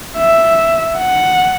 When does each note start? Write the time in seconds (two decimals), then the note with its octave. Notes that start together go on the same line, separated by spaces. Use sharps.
0.18 E5
0.98 F#5